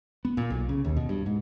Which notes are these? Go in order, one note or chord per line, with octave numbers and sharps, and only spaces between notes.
B3
A#2
B1
C#3
D#2
B2
G2
G#2